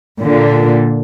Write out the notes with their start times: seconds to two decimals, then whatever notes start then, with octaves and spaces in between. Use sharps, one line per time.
0.19 A#2 D3